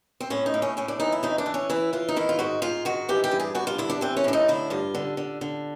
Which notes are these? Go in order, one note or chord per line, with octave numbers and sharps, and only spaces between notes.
C4
A2 C#4
D#4
A2
C#4
A2 C#4
D4
E3 D#4
E4
F2 D#4
D4
E3
C#4
E3 E4
E3 F4
D#4
D#3 E4
F4
G#2 F#4
G#2 F4
D#3 F#4
E3 G4
G4
G2
G#4
G2 F#4
F4
D3 E4
D4
E3 C4
C#4
A2 D4
D#4
D3 E4
G2 F4
D3
D3
D3